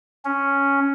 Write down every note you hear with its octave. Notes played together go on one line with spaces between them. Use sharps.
C#4